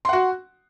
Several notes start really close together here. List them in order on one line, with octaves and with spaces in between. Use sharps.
C6 F#5 F#4